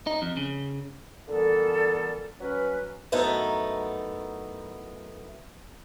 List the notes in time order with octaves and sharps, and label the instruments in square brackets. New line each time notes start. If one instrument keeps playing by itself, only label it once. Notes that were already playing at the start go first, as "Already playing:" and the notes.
[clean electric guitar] D#4
F2
C#3
[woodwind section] A#2 D3 E3 G3 B3 A4
F#3 C#4 B4
[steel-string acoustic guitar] F#2 A3 B3 D#4 E4